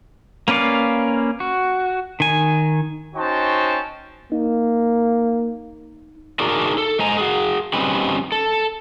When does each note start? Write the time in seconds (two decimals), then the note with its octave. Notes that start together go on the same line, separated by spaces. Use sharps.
0.48 A#3 C#4 B4 D5 F5
1.40 F#4
2.20 D#3 G#5
3.15 C#4 D#4 F#4 C5 G5 A5
4.32 A#3 D#4
6.39 D4 D#4 F#4 G#4 A#4 D5
6.78 A4
6.99 G#3 C5 D#5 G#5 A#5
7.17 F#4 G#4
7.74 G3 C4 C#4 D#4 B4
8.32 A4